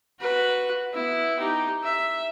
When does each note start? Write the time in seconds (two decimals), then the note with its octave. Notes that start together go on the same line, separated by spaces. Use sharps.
0.20 F#4 B4
0.93 B3 E4
1.39 D#4 G4
1.83 E5